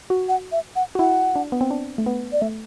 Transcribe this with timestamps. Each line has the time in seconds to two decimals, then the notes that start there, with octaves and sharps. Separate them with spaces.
0.10 F#4
0.29 F#5
0.52 E5
0.76 F#5
0.95 F#4
0.99 E4 F#5
1.36 D4
1.52 B3
1.61 C4
1.71 D4
1.98 A3
2.06 B3
2.32 D5
2.41 A3 E5